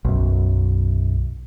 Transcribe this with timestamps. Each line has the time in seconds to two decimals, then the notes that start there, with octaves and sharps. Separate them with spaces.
0.05 B1 F#2